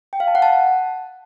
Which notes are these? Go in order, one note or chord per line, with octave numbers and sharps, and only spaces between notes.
G5
F5
A5
F#5
A5